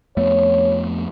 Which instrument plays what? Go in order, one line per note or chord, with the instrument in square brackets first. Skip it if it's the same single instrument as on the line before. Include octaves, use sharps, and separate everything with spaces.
[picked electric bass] F2 A3 B3 [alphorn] C#5